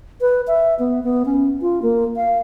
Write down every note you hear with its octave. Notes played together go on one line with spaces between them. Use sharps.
B4
E5
B3
B3
C#4
F4
A#3
F5